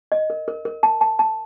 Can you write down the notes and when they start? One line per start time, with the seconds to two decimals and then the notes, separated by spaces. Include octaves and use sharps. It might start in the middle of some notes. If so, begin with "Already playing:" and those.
0.12 D#5
0.30 A#4
0.48 A#4
0.65 A#4
0.83 A5
1.01 A5
1.19 A5